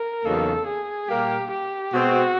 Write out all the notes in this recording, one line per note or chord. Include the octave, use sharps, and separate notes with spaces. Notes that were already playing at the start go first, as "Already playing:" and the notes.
Already playing: A#4
E2 C#3 F#3 A#3 D#4 A4
G#4
A#2 G3 A#3 G4
G4
B2 G#3 C4 F#4